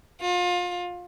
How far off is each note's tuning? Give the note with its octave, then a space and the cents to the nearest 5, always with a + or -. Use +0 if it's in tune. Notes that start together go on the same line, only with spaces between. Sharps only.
F4 +30